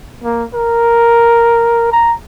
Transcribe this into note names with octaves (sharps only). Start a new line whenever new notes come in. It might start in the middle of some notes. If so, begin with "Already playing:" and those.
A#3
A#4
A#5